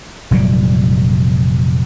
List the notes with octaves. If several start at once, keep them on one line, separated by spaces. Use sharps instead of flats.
F1 A#2 F#3 G3